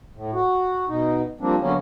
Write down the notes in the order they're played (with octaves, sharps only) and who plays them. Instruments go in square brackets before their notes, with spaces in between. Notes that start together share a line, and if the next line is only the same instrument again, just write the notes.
[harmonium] A2
F#4
B2 D#4
F3 G3 A#3 C4 D4
D3 F#3 A#3 B3 C#4